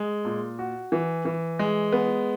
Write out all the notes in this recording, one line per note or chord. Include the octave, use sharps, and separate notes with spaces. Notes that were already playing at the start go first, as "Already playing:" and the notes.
Already playing: G#3
A#2
F#4
E3
E3
G#3
B3